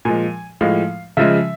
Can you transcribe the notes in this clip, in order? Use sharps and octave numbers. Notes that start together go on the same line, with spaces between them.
A#2 F3 G#3 G#5
A2 F3 G#3 F5
C#3 F3 G#3 E5